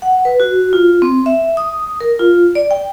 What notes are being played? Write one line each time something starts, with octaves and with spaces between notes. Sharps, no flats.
F#5
B4
F#4
F4
C4
E5
D#6
A#4
F4
D5
G5